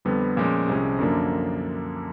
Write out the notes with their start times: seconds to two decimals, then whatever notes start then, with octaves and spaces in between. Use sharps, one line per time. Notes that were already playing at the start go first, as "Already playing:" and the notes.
0.05 F2 D3 G3 B3
0.37 A#2 F3 G#3 C#4
0.68 C2 C3 F3 G#3 C#4
0.99 F#2 D3 F3 A#3 D4